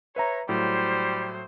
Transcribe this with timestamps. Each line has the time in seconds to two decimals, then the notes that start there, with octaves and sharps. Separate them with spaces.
0.16 B4 C#5 E5 A#5
0.49 A2 F#3 G3 C5